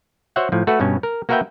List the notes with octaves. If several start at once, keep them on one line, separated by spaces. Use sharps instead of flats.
F#4 C5 C#5 E5 F#5
A2 F3
A3 F#4 A4 B4
G2 B2 C#4
A#4
A#3 F#4 A#4 B4 E5 G5